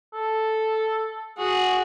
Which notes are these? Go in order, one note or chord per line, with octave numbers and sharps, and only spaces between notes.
A4
F#4 G#4